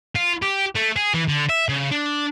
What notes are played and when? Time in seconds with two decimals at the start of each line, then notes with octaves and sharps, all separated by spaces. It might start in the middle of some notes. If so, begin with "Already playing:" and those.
0.15 F4
0.42 G4
0.75 A3
0.96 G#4
1.14 E3
1.28 D3
1.49 E5
1.69 C#3
1.91 D4